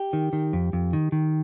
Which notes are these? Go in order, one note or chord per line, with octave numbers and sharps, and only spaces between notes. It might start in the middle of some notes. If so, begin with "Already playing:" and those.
Already playing: G4
D#3
D#3
F2
F2
D#3
D#3